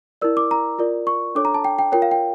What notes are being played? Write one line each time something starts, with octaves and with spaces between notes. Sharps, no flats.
E4 A#4 D5 E6
D6
A#5
F4 A#4 D5
C#6
D4 A4 C#5 D6
A#5
A5
G5
G5
F4 A#4 C#5 G5
F5
G5